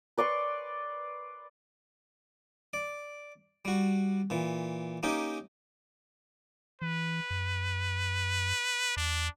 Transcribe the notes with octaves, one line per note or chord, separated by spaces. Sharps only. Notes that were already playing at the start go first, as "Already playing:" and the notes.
B4 D5 C6 C#6
D5
G3 F#4
A#2 E3
A#3 C#4 D#4 G4
E3 B4
F#2
E2 D4